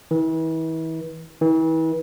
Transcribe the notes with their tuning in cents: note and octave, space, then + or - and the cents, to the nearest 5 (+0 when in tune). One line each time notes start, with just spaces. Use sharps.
E3 -35
E3 -35